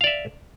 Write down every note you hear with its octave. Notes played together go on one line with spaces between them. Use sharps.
D5 E5 F5